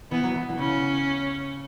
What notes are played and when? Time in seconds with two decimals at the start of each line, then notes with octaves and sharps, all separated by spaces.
0.11 E3 B3
0.24 F#3
0.35 E3
0.49 E3
0.58 C#3 C#4